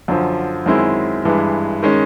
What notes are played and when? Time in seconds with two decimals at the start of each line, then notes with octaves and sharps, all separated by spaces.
0.08 F#2 D3 F3
0.66 F#2 D#3 G#3 C4 E4
1.25 G2 E3 G#3
1.83 D#3 G#3 C#4